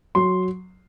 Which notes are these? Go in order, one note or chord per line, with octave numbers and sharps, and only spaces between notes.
F#3 C6